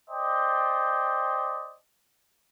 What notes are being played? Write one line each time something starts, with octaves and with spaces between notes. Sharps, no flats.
C5 D5 D#5 G5 A5